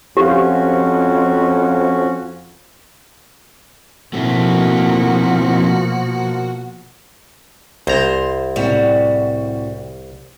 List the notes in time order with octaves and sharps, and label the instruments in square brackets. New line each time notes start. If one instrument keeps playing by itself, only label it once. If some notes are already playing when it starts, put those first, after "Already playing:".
[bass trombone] F2 [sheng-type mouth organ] C#4 F#4 [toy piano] G4 [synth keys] C5 F5
[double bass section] B2 F3 A#3 [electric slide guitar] A3 C4 E4 [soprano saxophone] F#4
[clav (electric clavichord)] C2 A#5 [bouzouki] C5
[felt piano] A2 C3 [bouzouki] G3 F#4